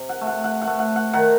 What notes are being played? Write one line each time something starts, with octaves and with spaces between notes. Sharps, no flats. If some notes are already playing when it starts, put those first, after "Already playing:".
Already playing: C3
F#5
A3
F#5
F#5
F#5
A3
F#5
F#5
D#3 F#5